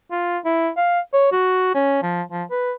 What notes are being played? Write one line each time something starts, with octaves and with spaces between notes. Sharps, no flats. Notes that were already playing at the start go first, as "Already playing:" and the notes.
F4
E4
F5
C#5
F#4
C#4
F3
F3
B4